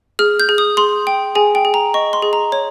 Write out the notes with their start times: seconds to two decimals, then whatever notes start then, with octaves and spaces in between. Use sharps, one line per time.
0.19 G#4 F6
0.40 G6
0.49 G#4
0.58 D#6
0.77 G#4 C6
1.07 G5
1.35 G#4 G#5
1.55 G5
1.65 G#4
1.74 A#5
1.94 D#5 C#6
2.13 C6
2.22 G#4
2.33 A#5
2.52 C#5